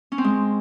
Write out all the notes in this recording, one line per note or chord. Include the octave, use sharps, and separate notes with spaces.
C#4
C4
G#3